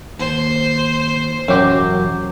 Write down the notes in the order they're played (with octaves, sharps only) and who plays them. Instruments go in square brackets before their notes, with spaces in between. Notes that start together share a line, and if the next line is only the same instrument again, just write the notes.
[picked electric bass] D#2 [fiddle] C5
[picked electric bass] E1 A1 [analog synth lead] F#2 [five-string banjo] F#3 G4